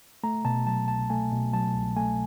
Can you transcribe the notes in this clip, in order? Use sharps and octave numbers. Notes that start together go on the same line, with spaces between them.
A3 A#5
B2 A5
F#3 A5
C2 A5
A3 G#5
B2
F#3 A5
C2
A3 G#5